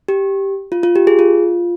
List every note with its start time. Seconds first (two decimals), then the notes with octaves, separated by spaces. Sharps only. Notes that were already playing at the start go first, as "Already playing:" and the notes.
0.08 G4
0.72 F4
0.83 F4
0.96 G4
1.07 G#4
1.19 F4